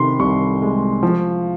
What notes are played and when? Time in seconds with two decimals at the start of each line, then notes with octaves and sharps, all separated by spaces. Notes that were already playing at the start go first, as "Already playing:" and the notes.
Already playing: C3 D#3 B5 C6
0.20 C2 C#6
0.62 G#3
1.03 F3